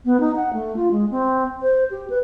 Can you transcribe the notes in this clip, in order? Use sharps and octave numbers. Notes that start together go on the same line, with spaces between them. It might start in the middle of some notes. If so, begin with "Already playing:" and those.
B3
D#4
F#5
A3
F4
G#3
C4
C5
G4
B4